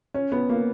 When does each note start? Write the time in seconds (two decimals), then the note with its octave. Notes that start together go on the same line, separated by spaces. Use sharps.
0.14 C#4
0.32 B3
0.50 A#3